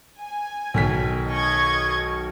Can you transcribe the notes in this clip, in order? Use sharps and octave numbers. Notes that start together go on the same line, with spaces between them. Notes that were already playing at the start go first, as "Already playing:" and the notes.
G#5
B1 D#3 B6
D#5 C#6 G#6